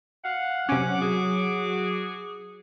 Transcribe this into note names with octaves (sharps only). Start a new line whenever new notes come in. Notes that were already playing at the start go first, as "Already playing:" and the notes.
F5 F#5
C3 F#3 C#4 D6
F#4 G#4